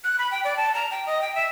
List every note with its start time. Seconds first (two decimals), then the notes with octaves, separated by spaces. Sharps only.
0.04 F#6
0.19 B5
0.31 G5
0.44 D5
0.57 A5
0.74 A#5
0.91 G5
1.07 D#5
1.21 G5
1.35 E5